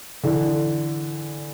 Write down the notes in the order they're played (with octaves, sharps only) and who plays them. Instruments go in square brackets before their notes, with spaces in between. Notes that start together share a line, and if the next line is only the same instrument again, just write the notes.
[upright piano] D3 E3